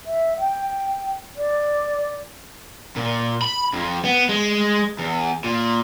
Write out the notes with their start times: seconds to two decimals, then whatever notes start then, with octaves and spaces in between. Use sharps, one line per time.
0.06 E5
0.38 G5
1.36 D5
2.96 A#2
3.42 B5
3.74 F2
4.05 B3
4.29 G#3
4.99 E2
5.44 A#2